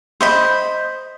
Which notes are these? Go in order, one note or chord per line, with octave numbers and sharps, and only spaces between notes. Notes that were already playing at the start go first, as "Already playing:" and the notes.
C5 D#5 B5